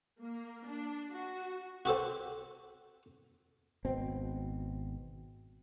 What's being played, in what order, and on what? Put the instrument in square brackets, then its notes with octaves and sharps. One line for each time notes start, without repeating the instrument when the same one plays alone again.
[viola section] A#3
D4
F#4
[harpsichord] F#4 G4 A4 C5
[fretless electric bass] G#1 B2 C4